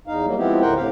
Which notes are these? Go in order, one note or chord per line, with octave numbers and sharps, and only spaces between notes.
E2 D#4 F5
F#3 G3 A#3
F3 G#3 B3 C4 E4 G4
D2 A2 A#4 C5 F#5 G5
A2 C3 G4 F5